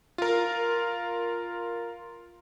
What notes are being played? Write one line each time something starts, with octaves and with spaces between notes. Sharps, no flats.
F4 A#4